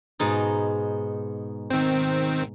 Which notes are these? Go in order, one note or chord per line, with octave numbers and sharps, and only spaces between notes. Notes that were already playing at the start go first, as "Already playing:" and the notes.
G#2 B2 D#4
D#3 C4